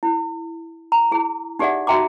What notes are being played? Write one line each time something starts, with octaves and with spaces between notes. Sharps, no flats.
E4
A#5
E4 G#4
D#4 G4 G#4 D5 E5 F#5
D#4 F#4 E5 G5 A#5 D6